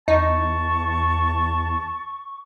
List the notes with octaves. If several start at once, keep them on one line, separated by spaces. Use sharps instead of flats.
E2 D#4 A5 C#6